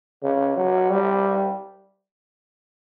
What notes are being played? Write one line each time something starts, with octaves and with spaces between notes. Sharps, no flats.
C#3
F#3
G3